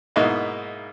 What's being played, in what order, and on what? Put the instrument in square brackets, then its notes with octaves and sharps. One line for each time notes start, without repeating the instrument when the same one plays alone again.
[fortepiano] G#2 B2 A#3 D#4 E4